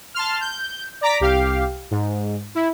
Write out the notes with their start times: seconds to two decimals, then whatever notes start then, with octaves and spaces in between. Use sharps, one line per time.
0.14 A5 C6 F6
0.41 G6
1.01 D5 A#5 D6 B6
1.20 C2 G4 F5
1.91 G#2
2.55 E4